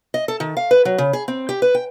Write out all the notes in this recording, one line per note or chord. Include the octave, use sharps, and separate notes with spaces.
D#5
A4
D#3
F5
B4
F#3
C#3
G#4
C4
G4
B4
G5